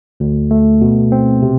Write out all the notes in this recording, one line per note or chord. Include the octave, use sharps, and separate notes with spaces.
D2
A3
B2
C4
C3